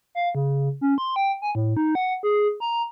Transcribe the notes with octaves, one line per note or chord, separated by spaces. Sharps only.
F5
C#3
C#4
C6
G5
G#5
A2
D#4
F#5
G#4
A#5